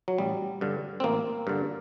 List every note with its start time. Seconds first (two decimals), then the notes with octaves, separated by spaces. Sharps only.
0.08 F#3
0.18 A1 G3
0.61 G2 D3
1.00 C4
1.04 A1 A#3
1.47 G2 D3